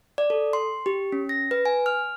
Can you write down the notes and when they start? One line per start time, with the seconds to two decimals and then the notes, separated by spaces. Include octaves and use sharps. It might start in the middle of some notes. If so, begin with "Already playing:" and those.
0.18 D5
0.30 A4
0.53 C6
0.86 G4
1.12 C#4
1.29 A#6
1.51 B4
1.66 G#5
1.86 F6